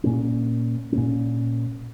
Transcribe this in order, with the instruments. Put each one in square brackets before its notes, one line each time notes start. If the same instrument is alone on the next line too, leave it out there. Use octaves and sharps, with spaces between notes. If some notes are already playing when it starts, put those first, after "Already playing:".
[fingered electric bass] A#2 A#3 C#4
A#2 A#3 C#4